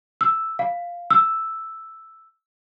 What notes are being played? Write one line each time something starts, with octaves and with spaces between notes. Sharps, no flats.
E6
F5
E6